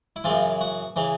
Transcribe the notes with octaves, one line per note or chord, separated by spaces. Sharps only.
E4
F#2 C#3 E3 F4
F#4
C#3 E3